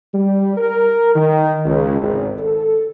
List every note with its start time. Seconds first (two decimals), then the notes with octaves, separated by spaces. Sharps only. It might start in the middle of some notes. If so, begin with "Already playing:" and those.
0.13 G3
0.56 A#4
1.15 D#3
1.65 C#2
2.01 G#1
2.38 A4